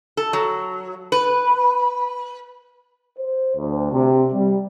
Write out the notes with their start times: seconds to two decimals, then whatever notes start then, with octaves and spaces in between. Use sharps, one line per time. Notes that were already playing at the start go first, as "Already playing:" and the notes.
0.17 A4
0.33 F#3
1.12 B4
3.19 C5
3.56 D2
3.92 C3
4.33 G3